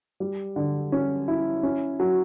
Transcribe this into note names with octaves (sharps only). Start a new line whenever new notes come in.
G3
D3
C#4
E4
C#4
F#3